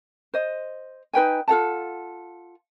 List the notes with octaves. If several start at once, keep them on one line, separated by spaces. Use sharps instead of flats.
C5 D#5
D#4 B4 G5 G#5
F4 A4 F#5 A5